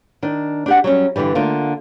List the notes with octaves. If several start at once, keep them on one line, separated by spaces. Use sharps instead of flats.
D#3 D4
D4 G4 F#5
F#3 G3 C#4
G2 B2 D3 E3 G3
D3 A3 A#3 D4 F4